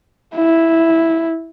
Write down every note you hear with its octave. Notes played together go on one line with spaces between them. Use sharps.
E4